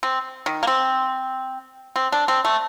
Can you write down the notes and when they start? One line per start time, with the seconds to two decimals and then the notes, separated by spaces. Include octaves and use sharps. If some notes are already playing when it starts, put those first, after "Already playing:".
0.03 C4
0.46 D#3
0.63 A#3
0.67 C4
1.96 C4
2.12 D4
2.28 C4
2.45 A3